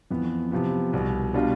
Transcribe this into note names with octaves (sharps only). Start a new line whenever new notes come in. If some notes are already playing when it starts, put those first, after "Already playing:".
F2 E3 B3
C3 F3 B3
C2 B2 B3
B2 G3 D4 F4